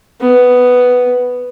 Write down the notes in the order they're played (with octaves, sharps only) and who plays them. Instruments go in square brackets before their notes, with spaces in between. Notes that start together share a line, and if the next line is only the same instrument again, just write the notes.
[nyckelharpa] B3